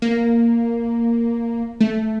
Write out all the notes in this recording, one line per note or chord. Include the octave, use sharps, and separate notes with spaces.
A#3
A3